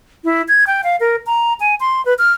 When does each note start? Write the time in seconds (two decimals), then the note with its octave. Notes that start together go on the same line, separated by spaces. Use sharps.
0.24 E4
0.48 G#6
0.67 G5
0.84 F5
1.00 A#4
1.26 A#5
1.60 G#5
1.80 C6
2.05 B4
2.19 F6